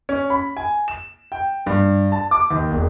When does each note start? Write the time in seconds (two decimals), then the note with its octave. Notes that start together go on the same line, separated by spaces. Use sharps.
0.09 C#4
0.30 B5
0.57 G#5
0.88 E7
1.32 G5
1.66 G2
2.12 A5
2.31 D6
2.51 D#2
2.71 E1